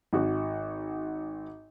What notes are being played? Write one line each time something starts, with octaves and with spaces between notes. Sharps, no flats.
G#1 F#4